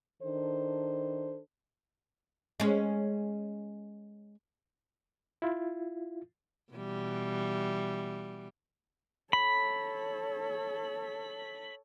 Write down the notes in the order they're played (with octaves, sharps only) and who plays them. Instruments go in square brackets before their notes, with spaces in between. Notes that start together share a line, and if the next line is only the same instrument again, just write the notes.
[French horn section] D#3 D4 A4 C5
[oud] G#3 C#4
[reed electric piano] E4 F4
[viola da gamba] B2 E3 G3
[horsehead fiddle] A4 C#5 [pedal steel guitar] B5